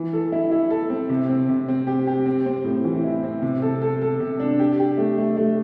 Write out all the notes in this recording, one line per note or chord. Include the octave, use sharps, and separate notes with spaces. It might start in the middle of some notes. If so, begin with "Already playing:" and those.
Already playing: E3
A4
E4
E4
A4
C4
C3
C4
C3
C4
G4
G4
C4
C4
A2
E3
E4
C4
C3
A4
A4
A4
C3
D4
G4
G4
A3
A3
A3